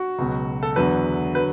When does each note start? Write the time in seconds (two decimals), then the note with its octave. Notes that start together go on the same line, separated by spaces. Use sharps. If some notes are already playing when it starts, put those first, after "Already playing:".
Already playing: F#4
0.19 C#2 B2 F#3
0.63 A4
0.76 E2 D3 F#3 B4
1.35 D3 F#3 B4